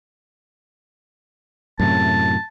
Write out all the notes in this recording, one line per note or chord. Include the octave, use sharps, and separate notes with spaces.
F#2 A2 C3 A5